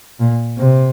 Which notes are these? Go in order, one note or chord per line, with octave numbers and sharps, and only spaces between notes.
A#2
C3